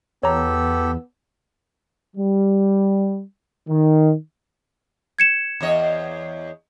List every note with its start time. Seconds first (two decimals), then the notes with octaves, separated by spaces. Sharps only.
0.23 E2 B3 G4 A4 C#5 A#5 E6
2.17 G3
3.69 D#3
5.19 G#6 C#7 E7
5.61 E2 C#5 D#5